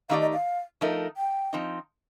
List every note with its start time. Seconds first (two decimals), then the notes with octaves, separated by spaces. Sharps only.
0.09 D#3 A3 D#4 G4 D5 F5
0.21 D#5
0.33 F5
0.81 F3 A3 D#4 A#4
1.17 G5
1.53 F3 C4 D#4